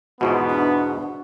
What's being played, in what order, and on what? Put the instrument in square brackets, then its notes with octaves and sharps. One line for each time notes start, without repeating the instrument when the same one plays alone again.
[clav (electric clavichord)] E2 G#2 B2 [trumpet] B3 [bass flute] F4 [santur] F#4
[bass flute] D4